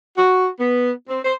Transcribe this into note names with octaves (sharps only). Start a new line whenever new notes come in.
F#4
B3
C4
C5